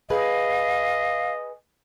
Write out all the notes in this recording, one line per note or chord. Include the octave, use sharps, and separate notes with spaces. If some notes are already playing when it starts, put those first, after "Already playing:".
G#4 B4 D#5 F5